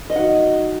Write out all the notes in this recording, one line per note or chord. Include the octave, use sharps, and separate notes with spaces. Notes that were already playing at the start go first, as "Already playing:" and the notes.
D#5
F#3 D#4 F#5